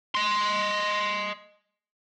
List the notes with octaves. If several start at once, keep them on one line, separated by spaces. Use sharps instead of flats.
D#5 C6